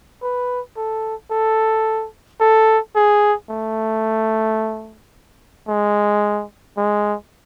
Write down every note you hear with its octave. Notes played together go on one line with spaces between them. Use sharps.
B4
A4
A4
A4
G#4
A3
G#3
G#3